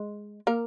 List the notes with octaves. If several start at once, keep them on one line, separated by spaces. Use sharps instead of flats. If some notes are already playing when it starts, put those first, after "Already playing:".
Already playing: G#3
A#3 A#4